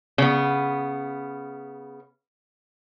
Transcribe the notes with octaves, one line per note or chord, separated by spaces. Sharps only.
C#3 B3